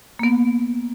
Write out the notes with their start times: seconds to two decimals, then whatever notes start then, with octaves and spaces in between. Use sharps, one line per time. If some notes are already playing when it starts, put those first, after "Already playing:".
0.19 A#3 B3